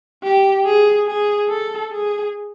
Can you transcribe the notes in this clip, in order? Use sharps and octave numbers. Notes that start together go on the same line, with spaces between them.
G4
G#4
G#4
A4
G#4